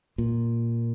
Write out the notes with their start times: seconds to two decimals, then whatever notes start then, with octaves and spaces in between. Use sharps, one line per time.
0.18 A#2